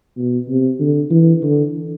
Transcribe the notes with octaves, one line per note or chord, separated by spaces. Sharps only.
B2
C3
D3
E3
D3